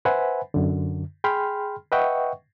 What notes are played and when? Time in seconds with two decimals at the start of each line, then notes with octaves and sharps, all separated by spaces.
0.05 B4 C5 E5 F#5 G#5 B5
0.54 F#2 D3
1.24 G#4 G5 B5 C6 F6
1.92 B4 D#5 E5 F#5 G5 C#6